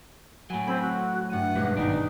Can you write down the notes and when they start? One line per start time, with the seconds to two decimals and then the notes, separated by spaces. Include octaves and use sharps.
0.50 A2 F#3 G#5 B5
0.67 C4 A4 B5 G#6
0.82 F#4
1.30 G2 A3 F#5 D#7
1.55 E1 G2 G#3 G4 B4
1.77 G#1 B2 D4 D#4